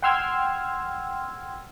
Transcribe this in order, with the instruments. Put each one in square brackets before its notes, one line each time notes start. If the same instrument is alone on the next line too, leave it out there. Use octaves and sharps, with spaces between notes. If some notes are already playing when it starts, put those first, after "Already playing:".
[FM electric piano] F#5 G5 C6 E6 F6 G#6